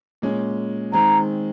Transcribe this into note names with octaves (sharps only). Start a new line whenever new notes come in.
A#2 G#3 C#4
D#3 G#3 C4 A#5